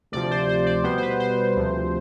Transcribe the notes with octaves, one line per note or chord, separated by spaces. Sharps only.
D2 C3 F3 D5
C5
C5
D5
B2 G3 B3 C5
C5
B4
C5
D2 C3 F3